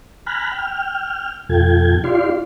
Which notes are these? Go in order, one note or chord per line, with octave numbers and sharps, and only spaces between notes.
G#5 A#5 B5 F6 F#6
G5 F6
F2 B2 F4 A4 G5 G#6
E4 F4 G4 D5 F5 C6